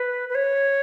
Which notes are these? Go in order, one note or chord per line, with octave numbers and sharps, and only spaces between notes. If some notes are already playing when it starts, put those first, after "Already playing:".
Already playing: B4
B4
C#5